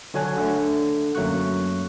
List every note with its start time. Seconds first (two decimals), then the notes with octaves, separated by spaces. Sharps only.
0.14 D3 F#3 D4 C#5 G#5 F#6
0.37 D3 A3
1.15 F#2 F#3 A3 A#3 C#6 F#6